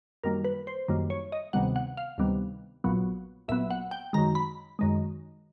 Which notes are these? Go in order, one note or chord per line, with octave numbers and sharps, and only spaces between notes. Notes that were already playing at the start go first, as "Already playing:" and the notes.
F#2 D#3 G3 A#3 A#4
B4
C5
F#2 D#3 G3 A#3
C#5
D#5
D2 C3 D#3 G3 B3 F#5
F#5
F5
D2 C3 D#3 G3 B3
A#1 A#2 F#3 B3
A#1 A#2 F#3 B3 E5
F#5
G5
F#2 D#3 G#3 A#5
B5
F#2 D#3 G#3